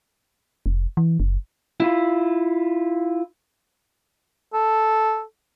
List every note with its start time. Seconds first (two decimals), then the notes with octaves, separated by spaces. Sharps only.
0.66 F1
0.97 E3
1.20 F#1
1.80 E4 F4
4.53 A4